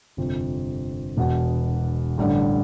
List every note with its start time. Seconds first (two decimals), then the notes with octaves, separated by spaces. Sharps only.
0.17 G1 F2 C3
1.17 E1 E2 B2
2.17 A1 G2 D3